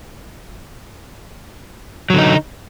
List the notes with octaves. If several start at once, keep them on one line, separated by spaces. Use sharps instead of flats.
D3 F#3 D#4